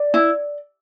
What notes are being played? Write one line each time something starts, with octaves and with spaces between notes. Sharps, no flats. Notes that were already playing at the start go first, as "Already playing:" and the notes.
Already playing: D5
E4